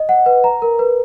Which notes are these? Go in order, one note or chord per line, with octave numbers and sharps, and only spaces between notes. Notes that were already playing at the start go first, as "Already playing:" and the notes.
Already playing: D#5
F#5
B4
A#5
A#4
B4